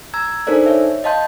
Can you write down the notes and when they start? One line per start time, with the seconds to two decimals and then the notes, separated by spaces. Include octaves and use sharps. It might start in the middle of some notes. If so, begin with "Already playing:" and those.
0.14 A#5 E6 G#6
0.47 D4 D#4 A4 A#4 C5 D5
0.66 C#5 E5
1.04 D#5 F5 A5 C6 G6